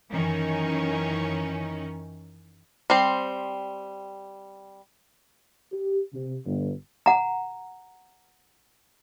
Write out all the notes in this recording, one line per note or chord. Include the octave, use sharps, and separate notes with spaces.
F#2 D#3 E3 C#4 D#4
G3 C4 C5
G4
C3
G1
F#5 A#5